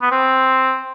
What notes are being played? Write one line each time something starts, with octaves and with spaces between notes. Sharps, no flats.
B3
C4